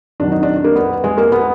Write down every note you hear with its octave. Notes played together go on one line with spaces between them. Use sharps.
F2 D#3 F#3 D4
D#4
D4
A#3
B3
G#3
A#3
B3